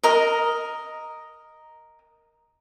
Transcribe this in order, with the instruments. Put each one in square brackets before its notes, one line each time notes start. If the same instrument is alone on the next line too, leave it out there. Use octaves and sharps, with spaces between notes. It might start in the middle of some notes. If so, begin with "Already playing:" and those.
[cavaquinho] A#4 D#5